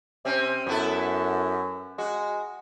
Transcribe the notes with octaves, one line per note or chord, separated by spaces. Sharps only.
C3 C4 C#4
F#2 B3 E4 A4
G#3 F#4